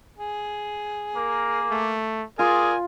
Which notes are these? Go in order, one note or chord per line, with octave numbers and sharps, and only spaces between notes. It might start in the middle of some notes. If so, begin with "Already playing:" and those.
G#4
A#3 A#4
A3
F4 G#4 A#4 D5 G#5